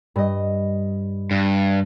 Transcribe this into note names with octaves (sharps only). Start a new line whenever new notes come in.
G2 D#5
G2